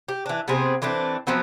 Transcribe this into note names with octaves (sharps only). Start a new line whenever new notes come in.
G4
E3 D4
C3 B3 C4 G#4
E3 A3 C4 D4
F3 F#3 B3 C4